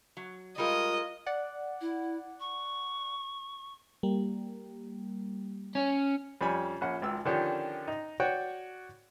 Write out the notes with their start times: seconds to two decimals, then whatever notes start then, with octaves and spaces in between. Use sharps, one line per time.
0.17 F#3
0.58 G3 G#3 F4 A#4 D#5
1.26 D5 F#5
1.81 E4
2.40 C#6
4.03 G3 A#3
5.75 C#4
6.41 F2 G3 C#4 G#5 B5
6.81 A#1 C#4 F#5
7.01 G#1 C#2 E6
7.25 D3 D#3 F3 C#4 D4 G4
7.88 D#4
8.20 F#4 C#5 D5 F#5 G5